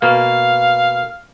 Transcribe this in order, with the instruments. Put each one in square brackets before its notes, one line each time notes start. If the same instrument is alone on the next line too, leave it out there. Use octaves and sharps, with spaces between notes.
[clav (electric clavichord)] B2 A#3 [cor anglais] F5